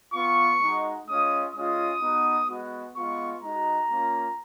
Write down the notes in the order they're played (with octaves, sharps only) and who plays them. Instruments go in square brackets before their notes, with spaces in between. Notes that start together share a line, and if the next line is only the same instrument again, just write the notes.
[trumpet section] B3 F4 C#6
G#3 D#4 F#4
G#3 C#4 F4 D#6
G#3 C#4 F4 D#6
B3 D#4 F#4
G#3 B3 F#4
G#3 B3 F4 C#6
G#3 D#4 F#4 A#5
A#3 C#4 F4